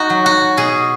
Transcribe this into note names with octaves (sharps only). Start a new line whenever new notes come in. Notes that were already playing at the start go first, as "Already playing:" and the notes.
Already playing: D#4 F#4
F#3
F#4
B2 G#4